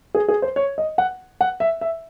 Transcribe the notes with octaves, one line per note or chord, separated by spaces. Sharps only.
G#4
G#4
C5
C#5
D#5
F#5
F#5
E5
E5